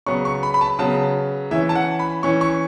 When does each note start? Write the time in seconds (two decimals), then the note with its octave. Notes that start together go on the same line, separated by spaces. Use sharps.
0.06 C#3 F#3 B3 C#6
0.25 C#6
0.43 B5
0.54 B5
0.61 A5
0.79 C#3 F#3 B3 A5
1.51 E3 C#4 E5
1.69 A5
1.75 F#5
1.99 B5
2.23 E3 C#4 C#6
2.41 C#6